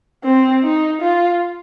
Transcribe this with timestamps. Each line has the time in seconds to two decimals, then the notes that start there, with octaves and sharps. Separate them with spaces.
0.24 C4
0.63 D#4
1.01 F4